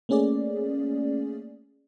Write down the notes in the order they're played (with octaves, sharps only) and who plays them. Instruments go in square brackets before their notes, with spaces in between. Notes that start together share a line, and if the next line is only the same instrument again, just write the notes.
[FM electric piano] A3 A#3 C#4 G#4 D5